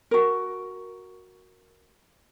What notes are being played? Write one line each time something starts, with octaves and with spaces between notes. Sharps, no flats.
F#4 A#4